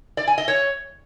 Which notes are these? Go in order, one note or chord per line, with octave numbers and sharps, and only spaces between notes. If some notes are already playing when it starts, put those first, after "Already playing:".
D5
G#5
D#5
C#5